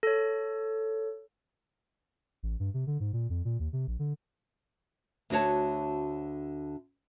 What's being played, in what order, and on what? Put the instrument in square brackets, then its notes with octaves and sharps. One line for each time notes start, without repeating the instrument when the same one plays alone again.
[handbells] A4 C#5
[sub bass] A1
G2
C3
D3
G#2
A#2
F2
A#2
D#2
C3
A#1
D3
[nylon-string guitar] D2 D3 F#4 C#5 A5